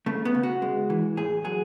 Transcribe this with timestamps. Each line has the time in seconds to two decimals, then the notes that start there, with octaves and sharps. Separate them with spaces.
0.06 C#3 A3
0.25 B3
0.35 C#3
0.43 F#4
0.62 G#3
0.90 E3
1.17 A2 G#4
1.44 F#3 G#4